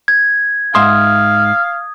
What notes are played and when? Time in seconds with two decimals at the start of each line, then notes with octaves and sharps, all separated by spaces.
0.08 G#6
0.75 G#2 E5 F5 C6 D#6